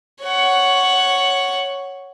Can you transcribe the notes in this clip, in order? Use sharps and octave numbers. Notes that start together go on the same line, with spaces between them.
C#5 F#5